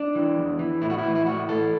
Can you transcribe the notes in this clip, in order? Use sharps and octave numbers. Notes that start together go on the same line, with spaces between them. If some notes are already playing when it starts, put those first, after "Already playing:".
Already playing: D4
E3
E2
E3
A2 E4
F#4
E4
E3
E4
A2 F#4
E3 A4